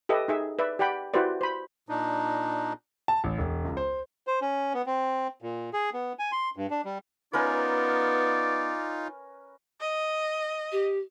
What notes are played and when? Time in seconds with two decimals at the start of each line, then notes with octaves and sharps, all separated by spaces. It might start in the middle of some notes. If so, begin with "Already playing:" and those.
0.09 G4 A4 B4 D#5 E5
0.28 D#4 G#4 E5
0.59 B4 D5 E5
0.79 G4 D5 F#5 G5 B5
1.14 E4 F#4 G4 B4 C5 D5
1.41 C5 B5
1.89 A#2 D4 D#4
3.08 A5
3.24 A1
3.38 E1
3.65 C#2
3.77 C5
4.27 C5
4.42 C#4
4.74 B3
4.86 C4
5.42 A#2
5.73 G#4
5.94 B3
6.19 G#5
6.32 C6
6.57 G2
6.70 D4
6.85 G3
7.33 B3 C#4 D#4 F4 A#4 B4 D5
9.81 D#5
10.72 G4